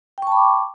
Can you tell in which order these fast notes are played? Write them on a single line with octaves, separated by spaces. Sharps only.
G5 C#6 A5 B5 D6